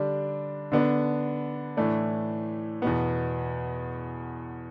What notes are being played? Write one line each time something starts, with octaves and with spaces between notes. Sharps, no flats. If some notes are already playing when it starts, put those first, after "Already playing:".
Already playing: D3 G3 D4
D3 B3 D4
A2 E3 A3 D4
E2 B2 B3